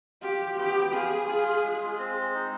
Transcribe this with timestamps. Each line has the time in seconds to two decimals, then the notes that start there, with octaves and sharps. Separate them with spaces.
0.22 F4 G4
0.58 B3 G4
0.93 F4 G#4
1.28 F4
1.64 G#3
1.99 C4
2.35 D#4